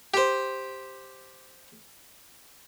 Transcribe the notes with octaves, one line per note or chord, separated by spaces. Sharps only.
G4 C5